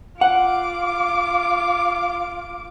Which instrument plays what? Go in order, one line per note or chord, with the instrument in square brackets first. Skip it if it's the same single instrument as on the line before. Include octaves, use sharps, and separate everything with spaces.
[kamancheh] F4 D6 [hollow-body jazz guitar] F#5